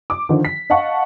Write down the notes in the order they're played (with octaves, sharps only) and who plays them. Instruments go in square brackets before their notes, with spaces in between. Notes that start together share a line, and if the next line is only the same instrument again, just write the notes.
[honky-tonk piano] D6
D3 D#3 F3
B6
D#5 F5 F#5 A5 C#6